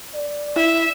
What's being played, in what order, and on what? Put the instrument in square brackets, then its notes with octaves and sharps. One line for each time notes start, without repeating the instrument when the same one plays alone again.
[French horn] D5
[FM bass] E4 [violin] E5